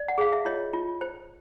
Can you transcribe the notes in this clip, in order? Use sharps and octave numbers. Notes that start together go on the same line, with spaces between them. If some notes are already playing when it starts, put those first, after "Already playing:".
Already playing: D5
F#5
G#4 F5
E5
F4 C#5 D#5
F4
C5